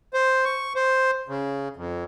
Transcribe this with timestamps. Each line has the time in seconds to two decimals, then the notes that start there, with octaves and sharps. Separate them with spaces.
0.14 C5
0.45 C#6
0.76 C5
1.28 C#3
1.76 F2